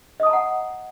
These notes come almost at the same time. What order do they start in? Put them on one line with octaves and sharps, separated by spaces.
D#5 D#6 A5 A#5 F#5